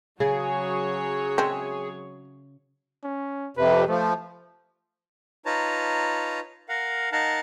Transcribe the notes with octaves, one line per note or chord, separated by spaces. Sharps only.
C#3 F#3 G#4 C#5
G#3 C4 E5
C#4
F2 C3 B4
F3 A3
D#4 F4 B4 C#5 A5 A#5
A#4 F5 F#5
D#4 A#4 F5 F#5 A5